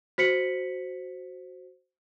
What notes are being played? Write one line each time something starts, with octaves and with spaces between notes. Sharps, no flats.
F#4 C5 B6 C#7 F#7